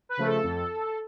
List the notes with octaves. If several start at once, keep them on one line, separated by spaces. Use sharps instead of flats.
B4
C#3 F3 A3
A4
F2